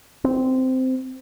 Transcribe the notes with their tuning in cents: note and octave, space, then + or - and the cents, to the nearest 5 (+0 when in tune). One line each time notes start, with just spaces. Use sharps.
C4 -15